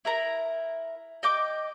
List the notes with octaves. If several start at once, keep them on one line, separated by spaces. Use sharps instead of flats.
E4 A#4 A#5
D#5 G5 D6